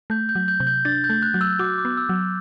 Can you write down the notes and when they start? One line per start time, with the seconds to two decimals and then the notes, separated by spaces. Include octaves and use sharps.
0.10 A3 G6
0.29 G6
0.35 F#3
0.48 G6
0.60 C3
0.67 G6
0.85 D4 A6
1.04 G6
1.09 A3
1.22 F#6
1.34 F#3
1.41 E6
1.59 F#4 D6
1.78 D6
1.85 B3
1.97 E6
2.09 F#3